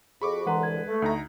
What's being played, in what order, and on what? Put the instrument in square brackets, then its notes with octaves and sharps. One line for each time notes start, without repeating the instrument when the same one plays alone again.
[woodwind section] F2 F#4 [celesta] G#4 [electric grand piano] B5 C#6 D6
[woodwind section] C2 D3 E3 [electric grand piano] G#3 B4 [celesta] F#5 A#5 C6
[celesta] G#6
[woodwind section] A3
[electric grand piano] D2 D#4 A#5